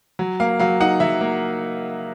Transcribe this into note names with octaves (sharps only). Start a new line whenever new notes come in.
F#3
A#3 F5
F#3 F5
D#4 F#5
F#3 E5
A#3